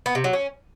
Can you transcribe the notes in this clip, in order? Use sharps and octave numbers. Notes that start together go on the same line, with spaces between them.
B3
C3
F#3
C#4